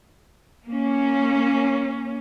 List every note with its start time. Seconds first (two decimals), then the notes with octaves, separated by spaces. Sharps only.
0.67 A#3 C#4